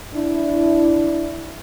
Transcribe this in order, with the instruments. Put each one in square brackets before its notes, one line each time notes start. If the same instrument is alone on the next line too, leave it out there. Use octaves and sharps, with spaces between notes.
[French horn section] D4 E4